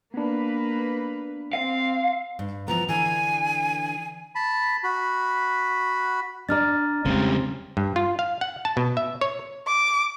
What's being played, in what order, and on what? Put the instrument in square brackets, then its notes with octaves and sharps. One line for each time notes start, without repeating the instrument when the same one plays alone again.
[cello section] A#3 B4 [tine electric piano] B3 D4
[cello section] C4 [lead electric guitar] F5
[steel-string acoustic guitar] G2
[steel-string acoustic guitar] E3 F3 B3 [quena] A#5
[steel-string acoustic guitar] D3 E3 [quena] G#5
[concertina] A5 B5
F#4 B5
[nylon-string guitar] D4 D5 [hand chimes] A#5 F6 A6
[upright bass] E2 G#3 [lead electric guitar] C#3 G3 [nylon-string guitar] C4
[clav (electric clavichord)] G2
F4
F5
F#5
A5
B2
E5
C#5
[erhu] D6